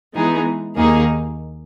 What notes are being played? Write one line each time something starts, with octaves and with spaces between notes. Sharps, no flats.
E3 G#3 B3 D#4 G#4
D#2 D#3 A#3 D#4 G#4